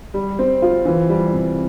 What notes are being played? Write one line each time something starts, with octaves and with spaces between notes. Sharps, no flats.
G3
C4
F4
E3
G3
C3